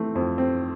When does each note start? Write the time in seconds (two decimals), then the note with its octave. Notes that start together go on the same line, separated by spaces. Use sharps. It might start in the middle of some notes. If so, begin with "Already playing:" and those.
Already playing: E3 A3 C4
0.15 F2
0.38 C4